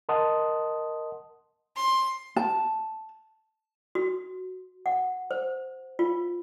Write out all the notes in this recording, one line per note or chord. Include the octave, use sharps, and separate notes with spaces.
A#4 D#5 F#5 A5 C6 D#6
C6
A5
F#4
F#5
C5
F4